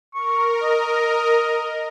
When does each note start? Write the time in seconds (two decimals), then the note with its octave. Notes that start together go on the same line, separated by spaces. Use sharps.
0.14 A#4 C#6
0.63 D#5